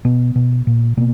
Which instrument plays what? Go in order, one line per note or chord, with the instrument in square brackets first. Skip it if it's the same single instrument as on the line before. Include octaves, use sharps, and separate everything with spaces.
[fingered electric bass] B2 B3
B2
A#2
B2 A#3